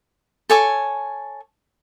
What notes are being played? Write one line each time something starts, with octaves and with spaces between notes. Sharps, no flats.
A4 C#5 G#5 D6